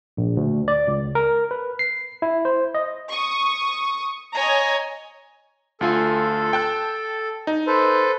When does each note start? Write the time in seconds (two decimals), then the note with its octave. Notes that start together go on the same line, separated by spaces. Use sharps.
0.17 A#1
0.37 D2
0.68 D5
0.87 C#2
1.15 A#4
1.51 B4
1.79 C7
2.22 E4
2.45 C5
2.74 D#5
3.11 C#6 D#6
4.36 C#5 D#5 G#5 A#5
5.81 D2 F4 A4 G#5
6.53 G5 A5 F#6
7.47 D#4
7.67 A4 B4 C5